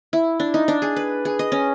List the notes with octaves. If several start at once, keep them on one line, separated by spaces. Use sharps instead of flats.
E4
D4
D#4
D4
G#4
B4
G#4
D#5
C#4